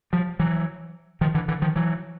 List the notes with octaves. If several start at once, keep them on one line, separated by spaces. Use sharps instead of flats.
F3 G3
E3 F#3
D#3 F3
D3 E3
D3 E3
D#3 F3
E3 F#3